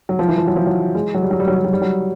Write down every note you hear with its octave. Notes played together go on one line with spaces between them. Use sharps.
F#3
F3
E3
F3
F#3
F3
F#3
G#3
F#3
G3
F#3
G3
F#3
G3
F#3
G3
F#3